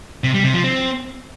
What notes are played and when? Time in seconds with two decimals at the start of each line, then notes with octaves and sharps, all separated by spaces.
0.24 C3
0.34 G3
0.44 C3
0.54 F3
0.64 C4